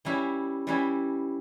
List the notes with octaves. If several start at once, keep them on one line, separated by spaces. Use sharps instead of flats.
E3 G3 C#4 E4
E3 G3 C#4 E4